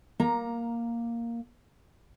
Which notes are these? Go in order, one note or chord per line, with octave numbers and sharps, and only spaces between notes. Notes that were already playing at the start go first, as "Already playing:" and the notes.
A#3 A#5